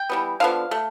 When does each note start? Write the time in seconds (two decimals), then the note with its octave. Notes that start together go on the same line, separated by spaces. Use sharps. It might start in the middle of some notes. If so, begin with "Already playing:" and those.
Already playing: G5
0.10 E3 G3 B3
0.40 D3 F3 B3 F5
0.71 A3